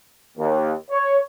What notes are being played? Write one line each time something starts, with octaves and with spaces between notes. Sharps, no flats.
D#2
C#5